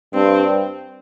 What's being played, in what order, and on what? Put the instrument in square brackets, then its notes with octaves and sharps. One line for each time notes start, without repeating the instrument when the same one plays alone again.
[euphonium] G2 [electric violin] C4